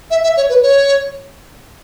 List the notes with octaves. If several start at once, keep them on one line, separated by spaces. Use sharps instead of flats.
E5
E5
C#5
B4
C#5